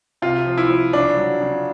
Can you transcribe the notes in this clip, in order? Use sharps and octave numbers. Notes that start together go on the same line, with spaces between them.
C3 F4
F3
E4
F3
C#3 D4
F#3
C#3